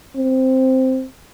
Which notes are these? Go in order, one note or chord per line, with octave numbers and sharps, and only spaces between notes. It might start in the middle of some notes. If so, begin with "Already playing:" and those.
C4